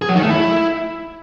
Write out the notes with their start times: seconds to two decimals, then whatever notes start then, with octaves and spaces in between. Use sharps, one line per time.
0.02 G#4
0.09 F#3
0.16 D#3
0.23 A3
0.30 E4